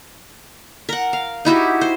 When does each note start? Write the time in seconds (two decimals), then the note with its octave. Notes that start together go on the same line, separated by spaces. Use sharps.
0.89 A#4 F#5
1.13 F5
1.45 D#4 E4 F#4 G4
1.81 C5